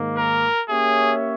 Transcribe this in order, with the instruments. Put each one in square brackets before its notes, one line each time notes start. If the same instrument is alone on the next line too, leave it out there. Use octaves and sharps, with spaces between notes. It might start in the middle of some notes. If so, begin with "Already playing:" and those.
Already playing: [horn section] G#2 D#3 A#3
[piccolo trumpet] A#4
[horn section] A#3 C#4 G4 C#5 E5 [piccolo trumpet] G#4